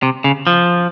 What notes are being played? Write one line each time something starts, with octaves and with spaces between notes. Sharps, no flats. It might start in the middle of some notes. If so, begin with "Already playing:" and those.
C3
C#3
F3